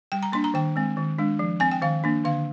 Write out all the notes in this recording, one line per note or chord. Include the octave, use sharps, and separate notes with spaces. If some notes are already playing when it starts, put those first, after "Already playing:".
G3 G5
A#5
A#3 D4 C6
A#5
D#3 G5
G#3 C4
D#3
G#3 D4
F3
C4 G#5
G5
D#3 F5
A#3 D4
D3 F5